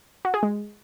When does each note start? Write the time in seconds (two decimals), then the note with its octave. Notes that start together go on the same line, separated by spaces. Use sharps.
0.25 F#4
0.34 G#4
0.43 G#3